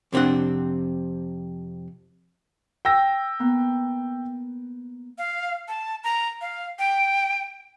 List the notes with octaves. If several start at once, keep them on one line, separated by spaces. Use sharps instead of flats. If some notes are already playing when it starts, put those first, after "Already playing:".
F2 C3 C4 D4 F#5
G5 E6 A#6
A#3 B3
F5
A5
A#5
F5
G5